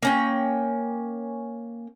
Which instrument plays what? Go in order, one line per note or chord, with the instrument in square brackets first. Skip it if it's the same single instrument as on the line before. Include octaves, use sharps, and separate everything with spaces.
[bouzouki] A#3 C#4 G5